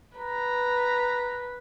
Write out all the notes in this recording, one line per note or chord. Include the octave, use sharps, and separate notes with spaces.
B4 A#5